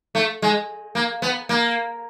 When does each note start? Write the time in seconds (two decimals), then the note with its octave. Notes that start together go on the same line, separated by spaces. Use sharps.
0.15 A3
0.42 G#3
0.95 A#3
1.22 B3
1.49 A#3